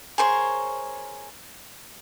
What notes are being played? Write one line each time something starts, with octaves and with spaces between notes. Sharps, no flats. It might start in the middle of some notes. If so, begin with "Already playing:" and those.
G#4 A#4 C5 C#5